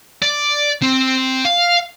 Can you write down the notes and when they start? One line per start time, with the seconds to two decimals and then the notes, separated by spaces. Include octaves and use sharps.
0.22 D5
0.82 C4
1.45 F5